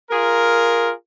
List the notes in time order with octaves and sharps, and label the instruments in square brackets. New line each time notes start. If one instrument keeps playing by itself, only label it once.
[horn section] F4 G#4 A#4